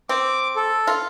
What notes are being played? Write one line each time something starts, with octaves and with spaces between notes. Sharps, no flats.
C4 D6
A4
F4